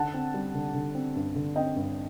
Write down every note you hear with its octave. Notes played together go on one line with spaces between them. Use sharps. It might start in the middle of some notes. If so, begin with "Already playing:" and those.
Already playing: D3 F#5 A5
C4
G3
D3
D3
C4
G2
D3
C4 D#5 G5
G2